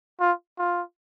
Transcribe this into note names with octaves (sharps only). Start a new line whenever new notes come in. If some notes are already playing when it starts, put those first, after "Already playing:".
F4
F4